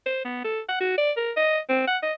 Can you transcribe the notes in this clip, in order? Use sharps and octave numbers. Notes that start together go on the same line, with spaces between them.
C5
B3
A4
F#5
F#4
D5
A#4
D#5
C4
F#5
D#5